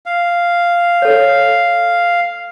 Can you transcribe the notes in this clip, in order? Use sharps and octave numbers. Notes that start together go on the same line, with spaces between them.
F5
A4 C#5